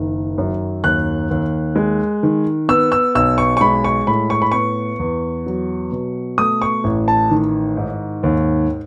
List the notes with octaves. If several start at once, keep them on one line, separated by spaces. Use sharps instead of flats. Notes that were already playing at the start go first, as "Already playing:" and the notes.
Already playing: F#1 D#3
F#2
D#2 F#6
D#2
G#3
D#3
B3 E6
E6
B1 E6
C#6
C#6
G#3 B5
C#6
A2 B5
C#6
B5
B3 C#6
E2
F#3
B2
A3 D#6
C#6
A1
A5
D#3
G#2
D#2